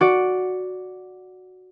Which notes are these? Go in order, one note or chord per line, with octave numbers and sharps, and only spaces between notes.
F#4 D5